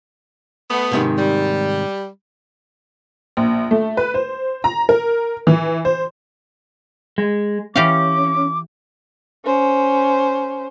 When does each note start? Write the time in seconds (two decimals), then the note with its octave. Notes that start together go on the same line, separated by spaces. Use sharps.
0.71 A3 B3
0.91 G#2 C3 D#3
1.18 G3
3.37 A#1
3.71 A3
3.97 B4
4.14 C5
4.64 A#5
4.89 A#4
5.47 E3
5.85 C5
7.18 G#3
7.76 E3 C#4 G4 F5 D6
9.45 C#4 C5